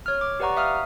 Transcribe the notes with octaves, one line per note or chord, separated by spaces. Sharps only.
C#5 F6
D6
G4 B4 D5 F#5 A#5 C#6
E5 F5 D#6 F6